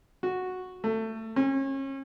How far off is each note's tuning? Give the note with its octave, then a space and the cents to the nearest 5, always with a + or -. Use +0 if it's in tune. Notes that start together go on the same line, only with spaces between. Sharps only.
F#4 -5
A3 +20
C#4 -35